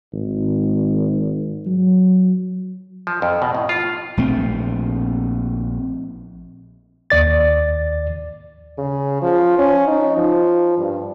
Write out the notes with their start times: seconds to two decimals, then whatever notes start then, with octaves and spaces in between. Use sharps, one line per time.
0.13 G#1
1.66 F#3
3.07 F3
3.22 F2
3.42 B2
3.55 A2
3.69 F4
4.17 A#1 A3 C4
7.10 D#2 D5 A6
8.78 C#3
9.22 F3
9.59 C#4
9.87 D#4
10.17 F3
10.78 G2